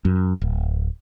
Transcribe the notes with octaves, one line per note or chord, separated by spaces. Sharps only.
F#2
D1